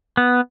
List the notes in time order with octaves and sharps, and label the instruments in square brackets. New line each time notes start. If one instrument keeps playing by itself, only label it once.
[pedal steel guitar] B3